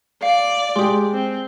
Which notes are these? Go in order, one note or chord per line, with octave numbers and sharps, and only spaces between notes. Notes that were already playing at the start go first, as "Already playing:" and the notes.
D5 F5
G#3 G4 C6 D#6
C4